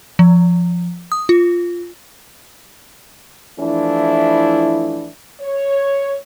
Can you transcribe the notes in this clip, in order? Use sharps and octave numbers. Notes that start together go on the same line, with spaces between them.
F3
D#6
F4
E3 F3 A3 D4 E4
C#5